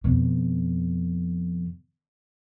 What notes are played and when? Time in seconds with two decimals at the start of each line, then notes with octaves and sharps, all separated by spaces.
0.04 F2 B2